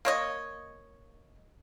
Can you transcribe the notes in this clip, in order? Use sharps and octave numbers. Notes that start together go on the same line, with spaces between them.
A#3 C#5 D#5